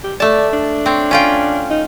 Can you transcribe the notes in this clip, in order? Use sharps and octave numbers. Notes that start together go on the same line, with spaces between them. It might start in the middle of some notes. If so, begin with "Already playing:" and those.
G4
A3 D5 A5
D4
C4 C#5
C#4 F4 G5
D#4